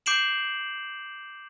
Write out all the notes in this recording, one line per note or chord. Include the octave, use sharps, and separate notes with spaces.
D6 G6 C7 D7 E7 F#7